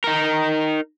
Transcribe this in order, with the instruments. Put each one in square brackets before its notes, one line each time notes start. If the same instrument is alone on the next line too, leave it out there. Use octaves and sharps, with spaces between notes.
[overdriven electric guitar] D#4 A#4